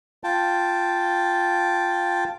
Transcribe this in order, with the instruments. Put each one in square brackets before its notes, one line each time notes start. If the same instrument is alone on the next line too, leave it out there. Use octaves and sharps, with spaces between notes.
[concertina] F4 G5 A5